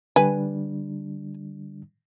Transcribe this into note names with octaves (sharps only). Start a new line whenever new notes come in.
D3 G3 D4 B4 G#5